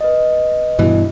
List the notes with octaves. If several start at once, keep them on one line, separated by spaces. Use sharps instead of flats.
B4 D#5
G2 B2 E3